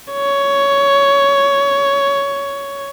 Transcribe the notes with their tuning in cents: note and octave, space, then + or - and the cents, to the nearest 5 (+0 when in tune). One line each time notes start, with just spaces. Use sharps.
C#5 +10